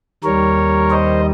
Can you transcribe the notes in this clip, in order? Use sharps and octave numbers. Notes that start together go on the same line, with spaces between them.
D#2 D#3 G3 A#4 C#5
C5 D#5